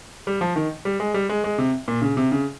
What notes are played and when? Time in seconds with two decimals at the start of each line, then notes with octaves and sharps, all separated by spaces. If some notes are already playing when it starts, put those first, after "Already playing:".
0.27 G3
0.41 F3
0.56 D#3
0.85 G3
1.00 G#3
1.14 G3
1.29 G#3
1.44 G#3
1.58 C3
1.88 A#2
2.02 C#3
2.17 C3
2.32 C#3